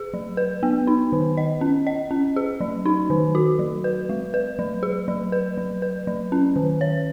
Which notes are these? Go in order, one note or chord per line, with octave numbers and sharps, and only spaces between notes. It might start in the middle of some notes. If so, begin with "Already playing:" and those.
Already playing: G#4
F#3
B4
B3
D#4
D#3
D#5
C#4
D#5
C#4
G#4
F#3
D#4
D#3
F#4
F#3
B4
G#3
B4
F#3
G#4
F#3
B4
F#3
B4
F#3
C#4
D#3
C#5